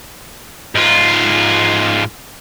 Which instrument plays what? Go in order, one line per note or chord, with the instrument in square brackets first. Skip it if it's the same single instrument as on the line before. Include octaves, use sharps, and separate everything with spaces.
[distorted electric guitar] G#2 F4